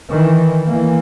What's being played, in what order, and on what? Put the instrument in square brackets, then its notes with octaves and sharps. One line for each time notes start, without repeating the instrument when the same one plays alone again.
[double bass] D#3 E3
E3 A#3